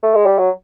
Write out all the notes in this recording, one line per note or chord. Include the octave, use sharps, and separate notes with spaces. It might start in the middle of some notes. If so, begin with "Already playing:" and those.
A3
G#3
G3
F#3